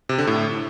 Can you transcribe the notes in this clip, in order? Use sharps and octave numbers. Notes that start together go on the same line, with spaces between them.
C3
D3
A2